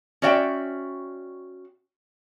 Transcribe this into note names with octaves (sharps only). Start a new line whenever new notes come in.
C#4 F#4 D5 E5 G5